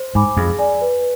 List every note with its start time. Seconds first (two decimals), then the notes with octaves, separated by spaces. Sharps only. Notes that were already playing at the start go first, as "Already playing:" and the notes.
Already playing: C5
0.15 G#2 G#5 B5 D6
0.37 F2 G#4
0.59 D5 G#5
0.81 B4